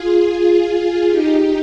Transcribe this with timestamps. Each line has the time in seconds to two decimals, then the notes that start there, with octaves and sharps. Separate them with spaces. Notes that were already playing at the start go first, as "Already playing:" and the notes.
Already playing: F4 G#4
1.09 D#4 G4